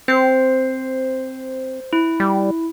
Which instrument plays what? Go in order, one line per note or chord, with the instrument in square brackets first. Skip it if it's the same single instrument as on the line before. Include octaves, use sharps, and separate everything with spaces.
[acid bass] C4 [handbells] C5 C7
[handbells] E4
[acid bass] G3